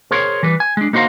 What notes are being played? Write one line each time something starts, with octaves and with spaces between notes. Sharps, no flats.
G#4 A#4 C5 C#5
E3 G3 B4
G#5
G#3 D4
A#3 D#4 F#4 C5 F5 A#5